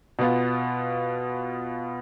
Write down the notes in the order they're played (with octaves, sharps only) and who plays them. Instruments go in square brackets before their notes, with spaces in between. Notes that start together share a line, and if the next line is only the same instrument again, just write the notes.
[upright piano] B2 B3 F4